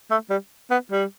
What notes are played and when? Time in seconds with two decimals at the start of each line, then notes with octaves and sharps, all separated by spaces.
0.11 A3
0.30 G3
0.71 B3
0.92 G3